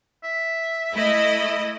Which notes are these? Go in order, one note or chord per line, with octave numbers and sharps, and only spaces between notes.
E5
A3 E4 D#5